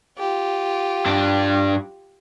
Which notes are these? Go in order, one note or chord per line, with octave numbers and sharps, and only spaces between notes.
F4 G4
G2 D4